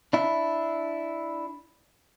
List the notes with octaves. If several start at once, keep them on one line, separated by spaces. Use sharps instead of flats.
D4 E4